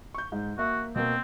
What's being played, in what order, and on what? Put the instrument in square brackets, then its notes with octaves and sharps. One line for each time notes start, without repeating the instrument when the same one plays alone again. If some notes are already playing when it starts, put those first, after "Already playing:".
[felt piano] C#6 G6
G#2
[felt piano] A#3 E5 [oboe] F#4
[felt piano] B2 A#3 [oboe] C4